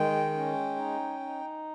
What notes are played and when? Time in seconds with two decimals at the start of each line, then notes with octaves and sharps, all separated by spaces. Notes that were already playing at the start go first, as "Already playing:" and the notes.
Already playing: D#3 G#3 G5
0.34 C#4
0.76 D#4
1.19 D#4